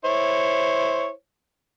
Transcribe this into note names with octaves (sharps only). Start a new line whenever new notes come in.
E4 C5 C#5